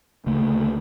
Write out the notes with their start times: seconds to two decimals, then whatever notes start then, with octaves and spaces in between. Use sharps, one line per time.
0.26 D2 C#3 A3